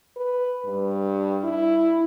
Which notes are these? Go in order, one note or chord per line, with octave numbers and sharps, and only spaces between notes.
B4
G2
E4